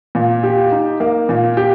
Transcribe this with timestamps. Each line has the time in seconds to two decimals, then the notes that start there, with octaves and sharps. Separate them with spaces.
0.15 A#2
0.43 G4
0.72 D#4
1.00 A#3
1.29 A#2
1.57 G4